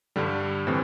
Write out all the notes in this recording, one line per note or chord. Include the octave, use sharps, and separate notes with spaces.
G2 D3 G3
A2 E3 G3 C4